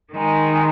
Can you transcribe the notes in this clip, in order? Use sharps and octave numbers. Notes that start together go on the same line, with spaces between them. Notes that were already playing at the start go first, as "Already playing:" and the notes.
D#3 G#3 D#4